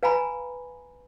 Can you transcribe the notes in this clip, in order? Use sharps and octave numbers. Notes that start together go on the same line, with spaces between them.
B4 F5 G#5 A#5 B5